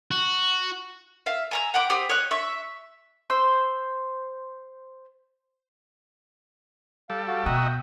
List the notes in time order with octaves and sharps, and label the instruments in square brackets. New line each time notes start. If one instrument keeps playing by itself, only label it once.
[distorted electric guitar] F#4
[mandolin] E5 F5
G#5 A#5 E6
F#5 G5 B5 D6
G4 C5 D#6 E6
C#5 D#5 F#6
E5 C#6
C5 C6 E6
[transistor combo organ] G3 A4 [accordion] F5
[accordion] F#4 F5
[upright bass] B2 [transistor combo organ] F#4 D#5 E5 [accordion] G5 A#5
[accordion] G6